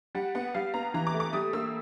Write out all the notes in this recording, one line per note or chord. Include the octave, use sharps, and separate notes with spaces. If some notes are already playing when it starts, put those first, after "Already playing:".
G3 F#5
B3 F#5
G3 F5
B3 A#5
E3 A#5
D6
A3
D6
G3 D#6
A#3 E6